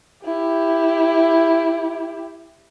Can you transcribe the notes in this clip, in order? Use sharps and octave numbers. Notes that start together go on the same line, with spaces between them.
E4 G4